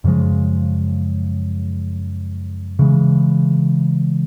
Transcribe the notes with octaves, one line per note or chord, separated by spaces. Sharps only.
F#2 C#3 F3 G#3
C#3 E3 G#3